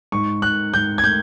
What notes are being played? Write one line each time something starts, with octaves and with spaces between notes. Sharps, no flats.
G#2 C#6
G#2 F#6
G#2 G6
G#6
A3 G6